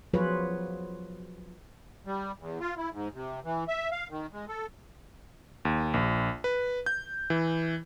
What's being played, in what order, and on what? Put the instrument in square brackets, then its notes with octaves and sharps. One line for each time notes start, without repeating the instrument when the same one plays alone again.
[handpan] F3 F#3 F4 G#4 B4 C#5
[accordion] G3
E2
F4
E4
G#2
C3
E3
E5
F5
D#3
G#3
A4
[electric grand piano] D#2
A#1
B4
G6
E3